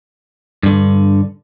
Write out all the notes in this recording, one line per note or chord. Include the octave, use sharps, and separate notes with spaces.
G2 D3